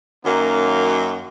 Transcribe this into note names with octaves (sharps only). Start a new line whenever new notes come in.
F#2 D#3 F#3 A#3